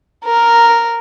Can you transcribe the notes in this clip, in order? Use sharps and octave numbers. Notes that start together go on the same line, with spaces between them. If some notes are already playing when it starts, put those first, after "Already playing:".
A#4